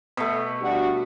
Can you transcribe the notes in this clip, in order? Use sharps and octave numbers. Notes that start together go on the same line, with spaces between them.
B2 A3
G3 D4 F#4